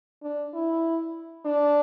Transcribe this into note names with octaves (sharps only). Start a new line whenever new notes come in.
D4
E4
D4